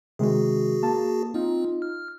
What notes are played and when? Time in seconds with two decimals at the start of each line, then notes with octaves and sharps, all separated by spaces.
0.19 C3 D#3 G#3 F#4 G#4
0.82 A#3 A5
1.34 C4 D#4 F4
1.82 F6